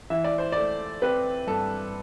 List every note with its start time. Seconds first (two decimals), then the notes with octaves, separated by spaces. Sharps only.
0.10 E3 E5
0.24 D5
0.38 C5
0.52 A3 D5
1.02 C4 B4
1.47 G2 A4